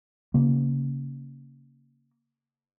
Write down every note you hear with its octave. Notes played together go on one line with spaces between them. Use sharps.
C#3 A#3